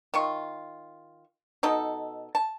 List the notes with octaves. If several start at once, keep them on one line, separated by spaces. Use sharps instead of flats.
D#3 F4 C#6
B2 D#4 A4
A5